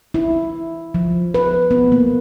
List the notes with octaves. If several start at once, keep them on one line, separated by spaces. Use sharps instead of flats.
E4
F3
B4
B3
A#3